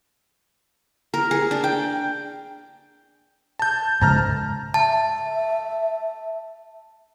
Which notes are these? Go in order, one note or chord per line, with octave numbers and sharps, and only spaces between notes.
A#4
G#4
D4
G5
A5 G6
G#2 C#3 G#3 A5 A#5 F6
E5 A5